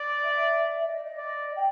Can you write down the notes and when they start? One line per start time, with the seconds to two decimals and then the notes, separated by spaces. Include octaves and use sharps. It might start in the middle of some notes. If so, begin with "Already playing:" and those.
Already playing: D5
0.22 E5
0.86 D#5
0.95 D5
1.03 D#5
1.18 D5
1.55 G5